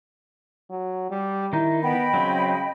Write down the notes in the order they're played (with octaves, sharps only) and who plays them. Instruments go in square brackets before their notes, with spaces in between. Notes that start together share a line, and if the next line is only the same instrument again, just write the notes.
[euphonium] F#3
G3
[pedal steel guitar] D#3 D#4 [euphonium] E4
[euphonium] B3 [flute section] D#5 G5 B5
[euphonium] C#3 [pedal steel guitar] F#3 C4